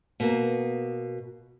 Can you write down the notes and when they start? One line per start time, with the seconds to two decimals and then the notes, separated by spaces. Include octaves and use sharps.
0.20 B2 A#3